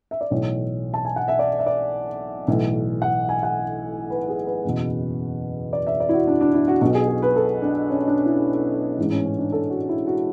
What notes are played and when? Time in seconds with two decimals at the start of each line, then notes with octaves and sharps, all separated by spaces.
0.11 E5
0.21 D5
0.30 B1 A2 E3 C#5
0.94 A5
1.05 G#5
1.16 F#5
1.28 E5
1.39 D5
1.59 E5
1.66 D5
2.48 B1 A2 E3
3.02 F#5
3.29 G#5
3.43 F#5
4.10 B4
4.29 G#4
4.46 B4
4.64 F#1 E2 B2
5.73 D5
5.87 E5
6.00 D5
6.09 E4
6.14 F#4
6.27 D4
6.41 D4
6.54 E4
6.68 F#4
6.81 B1 B2 F#4
6.94 G#4
7.08 G#4
7.22 B4
7.36 A4
7.62 D4
7.90 C#4
8.08 D4
8.26 E4
8.98 A1 G#2 E3 D4
9.12 C#4
9.25 C#4
9.39 D4
9.52 A4
9.70 F#4
9.89 E4
10.07 F#4